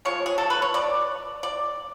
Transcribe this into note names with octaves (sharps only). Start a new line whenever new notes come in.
F3 G#3 C#5
G#4
A4
B4
C#5
D5
D5